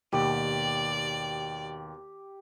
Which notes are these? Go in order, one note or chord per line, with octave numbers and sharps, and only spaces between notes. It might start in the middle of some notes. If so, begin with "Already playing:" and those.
D#2 B2 G4 D5